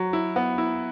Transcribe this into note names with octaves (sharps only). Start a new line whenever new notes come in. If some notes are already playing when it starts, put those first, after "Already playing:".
Already playing: F#3
E4
B3
E4